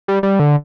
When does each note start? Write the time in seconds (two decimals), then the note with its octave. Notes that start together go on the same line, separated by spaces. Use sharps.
0.08 G3
0.23 G3
0.40 D3